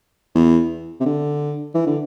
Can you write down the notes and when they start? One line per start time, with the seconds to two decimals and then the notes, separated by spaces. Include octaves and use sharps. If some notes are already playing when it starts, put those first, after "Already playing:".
0.35 E2
1.01 C3
1.06 D3
1.75 E3
1.87 D3